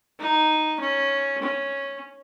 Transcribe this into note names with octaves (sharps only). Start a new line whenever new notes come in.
D#4
C#4
C#4